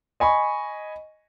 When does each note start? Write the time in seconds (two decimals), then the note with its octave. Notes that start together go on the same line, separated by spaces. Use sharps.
0.20 D#5 G#5 B5 C#6